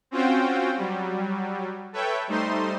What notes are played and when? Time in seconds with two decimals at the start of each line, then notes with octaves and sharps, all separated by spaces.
0.11 C4 C#4 F4 F#4 C5 G5
0.77 F#3 G3
1.93 A4 B4 C#5 E5 G5
2.28 G3 A3 D#4 C5 C6